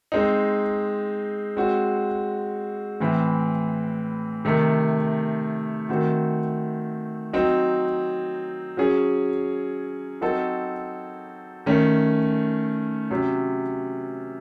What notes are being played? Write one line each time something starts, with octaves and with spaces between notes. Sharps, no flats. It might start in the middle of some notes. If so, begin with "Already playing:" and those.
G#3 C4 D#4
G#3 C4 F#4 C#5
A2 E3 C4
C3 D#3 A3
D#3 A3 C4 F#4
F#3 C4 D#4
F#3 C#4 G#4 C#5
F#3 C4 D#4 F#4 A4
D#3 A3 C#4
C3 F#3 C#4